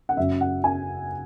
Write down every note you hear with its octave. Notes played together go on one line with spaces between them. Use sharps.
F#5
F#1 F#2 F#3 E5
F#5
G#5